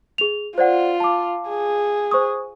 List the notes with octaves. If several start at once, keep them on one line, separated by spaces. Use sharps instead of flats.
G#4 F7
F4 C5 D5 F#5
A5 D6
G#4
C5 C#6 D#6